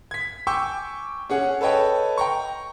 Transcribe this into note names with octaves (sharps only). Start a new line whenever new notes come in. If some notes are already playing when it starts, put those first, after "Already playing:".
G#6 B6
G5 G#5 C#6 D6 E6 G6
C#4 G#4 F#5
A4 B4 C#5 D#5 G5
G5 A#5 C#6